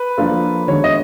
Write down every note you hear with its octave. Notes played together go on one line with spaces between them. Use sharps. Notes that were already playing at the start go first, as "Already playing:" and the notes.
Already playing: B4
F3 A#3 D4 F4 A4
D#3 G#3 B3 D4 F#4 C#5
D#5